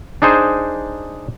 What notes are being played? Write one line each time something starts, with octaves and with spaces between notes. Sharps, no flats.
D4 D#4 G#4 C5